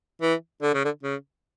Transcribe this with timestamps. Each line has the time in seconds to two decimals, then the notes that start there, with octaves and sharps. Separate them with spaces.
0.21 E3
0.62 D3
0.74 C#3
0.85 D3
1.03 C#3